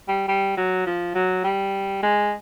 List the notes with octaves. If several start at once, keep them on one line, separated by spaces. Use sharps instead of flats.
G3
G3
F#3
F3
F#3
G3
G#3